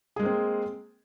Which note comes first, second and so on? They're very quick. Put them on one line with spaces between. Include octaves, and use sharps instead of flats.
G#4 G#3 A#3 C4